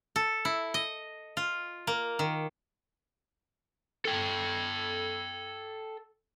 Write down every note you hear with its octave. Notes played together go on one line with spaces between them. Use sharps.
A4
E4
D#5
F4
A#3
D#3
A4 G5